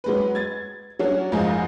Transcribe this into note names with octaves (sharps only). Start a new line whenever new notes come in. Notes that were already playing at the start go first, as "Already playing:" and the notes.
F#3 G#3 B4
G#6 A6
F#3 C#4 D4
F#1 G#2 F3 F4 D#5 G#5